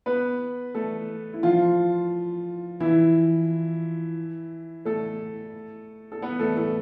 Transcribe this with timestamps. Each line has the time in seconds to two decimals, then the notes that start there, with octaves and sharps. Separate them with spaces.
0.06 B3 B4
0.74 A3 A4
1.34 E4
1.43 F3 F4
2.80 E3 E4
4.85 A3 A4
6.12 A4
6.22 B3 B4
6.39 A3 A4
6.57 A3 A4